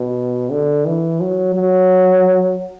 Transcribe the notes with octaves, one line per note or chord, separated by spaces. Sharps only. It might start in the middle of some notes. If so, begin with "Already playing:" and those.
Already playing: B2
D3
E3
F#3
F#3